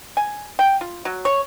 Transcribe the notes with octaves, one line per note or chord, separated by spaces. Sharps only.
G#5
G5
F4
F#3
C#5